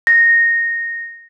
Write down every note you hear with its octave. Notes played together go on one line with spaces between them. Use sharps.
A#6